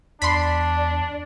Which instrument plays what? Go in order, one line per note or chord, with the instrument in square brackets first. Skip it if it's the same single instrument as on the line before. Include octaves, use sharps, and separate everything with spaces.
[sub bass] E2 [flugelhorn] D4 [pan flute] D5 [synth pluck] B5 C6